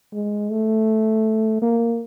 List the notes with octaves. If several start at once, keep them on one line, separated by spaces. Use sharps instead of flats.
G#3
A3
A#3